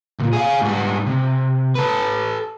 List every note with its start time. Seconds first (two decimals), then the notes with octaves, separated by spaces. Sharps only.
0.19 C#2 A#2
0.33 G#4 F5
0.62 G#2 G3
1.06 C3
1.75 A4 B4